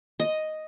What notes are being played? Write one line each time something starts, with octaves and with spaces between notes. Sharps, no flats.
D#5